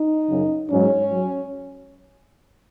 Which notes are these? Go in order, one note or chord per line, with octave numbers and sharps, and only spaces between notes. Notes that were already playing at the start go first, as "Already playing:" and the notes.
Already playing: D#4
F#2 C#3 F#3
G#2 F#3 C#4
F#3